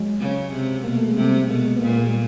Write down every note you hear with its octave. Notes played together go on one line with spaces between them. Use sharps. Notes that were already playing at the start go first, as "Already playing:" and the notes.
Already playing: F#3 G#3
C#3
C3
B2 A#3
A3
G#3
C3 G3 A3
A3
B2 G#3 A#3
G#3 A#3
B3
A#2 G#3 A#3
A3 B3
G#3 A#3
G3 A3